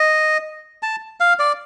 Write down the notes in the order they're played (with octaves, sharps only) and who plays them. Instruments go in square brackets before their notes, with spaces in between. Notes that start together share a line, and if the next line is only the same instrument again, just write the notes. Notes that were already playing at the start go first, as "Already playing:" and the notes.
Already playing: [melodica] D#5
A5
F5
D5